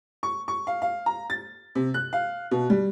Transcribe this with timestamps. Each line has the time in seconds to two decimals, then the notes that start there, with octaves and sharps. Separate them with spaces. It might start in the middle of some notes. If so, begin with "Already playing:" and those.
0.23 C#6
0.48 C#6
0.67 F5
0.82 F5
1.06 A#5
1.30 A6
1.75 C3
1.94 F#6
2.13 F5
2.51 B2
2.70 G3